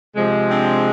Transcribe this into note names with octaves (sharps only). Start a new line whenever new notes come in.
C3 F3 G#3
C4 D4